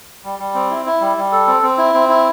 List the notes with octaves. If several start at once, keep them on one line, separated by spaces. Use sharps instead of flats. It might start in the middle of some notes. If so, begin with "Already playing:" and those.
G3
G3
C4
E4
E4
G3
G3
A4
C4
C4
E4
C4
E4